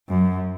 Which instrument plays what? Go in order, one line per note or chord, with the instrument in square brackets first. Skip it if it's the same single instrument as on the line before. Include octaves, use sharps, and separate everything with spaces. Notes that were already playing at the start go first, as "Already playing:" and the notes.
[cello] F#2